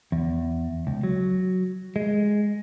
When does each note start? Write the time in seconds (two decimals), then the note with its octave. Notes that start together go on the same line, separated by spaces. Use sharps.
0.12 E2
0.87 C#2
1.03 F#3
1.96 G#3